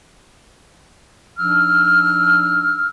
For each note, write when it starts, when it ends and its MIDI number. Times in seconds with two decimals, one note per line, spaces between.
1.38 2.88 53
1.38 2.88 62
1.38 2.88 63
1.38 2.88 88
1.38 2.88 89